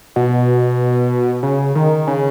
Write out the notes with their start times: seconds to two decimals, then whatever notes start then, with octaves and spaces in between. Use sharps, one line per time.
0.16 B2
1.43 C#3
1.75 D#3
2.07 C#3